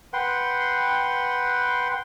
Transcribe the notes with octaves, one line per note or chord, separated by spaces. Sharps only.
B4 F#5 G5 C6